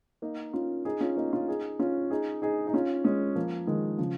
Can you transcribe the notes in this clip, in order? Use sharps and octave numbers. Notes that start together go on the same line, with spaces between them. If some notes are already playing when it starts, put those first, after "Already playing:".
A#3 D#4
C#4 F4
D#4 G#4
C#4 F4
A#3 D#4
C#4 F4
D#4 G#4
C#4 F4
D#4 G#4
D#4 G#4
D#4
C#4 F4
G#3 C#4
F3 A#3
D#3 G#3
C#3 F3